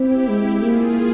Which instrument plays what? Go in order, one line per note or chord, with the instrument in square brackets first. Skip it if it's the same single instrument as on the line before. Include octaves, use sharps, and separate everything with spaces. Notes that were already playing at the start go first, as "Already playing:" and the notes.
Already playing: [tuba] C4 [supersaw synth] E4 G4
[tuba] G#3 [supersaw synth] E4 G4
[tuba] A#3 [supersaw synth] F4 G#4